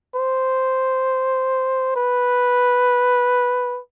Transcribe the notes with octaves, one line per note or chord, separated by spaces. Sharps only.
C5
B4